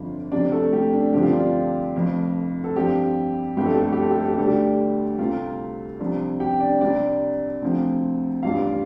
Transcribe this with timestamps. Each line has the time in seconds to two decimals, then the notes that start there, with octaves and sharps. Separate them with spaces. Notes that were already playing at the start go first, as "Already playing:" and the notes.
Already playing: G1 F2 D3 F3 F4
0.32 F2 C3 G3 D4 D5
0.52 A3 A4
0.72 G3 G4
0.93 D4
1.13 G2 D3 F3 C4 G4
1.23 F4
1.31 D4
1.39 F4
1.95 F1 F2 F3
2.64 A4
2.75 G2 F3 G3 C4 G4
3.57 G1 F2 F3 A3 D4 G4
3.66 A4
3.75 G4
3.83 A4
3.92 G4
4.01 A4
4.10 G4
4.19 A4
4.28 G4
4.37 D2 D3 A3 D4 A4
4.47 G3 G4
5.19 C2 C3 A3 C4 F4
6.00 C2 C3 F3 C4 D4
6.40 G4 G5
6.60 D4 D5
6.81 C2 C3 G3 C4 D4 D5
7.62 D2 C3 F3 C4
8.43 A1 G2 G3 F4 F5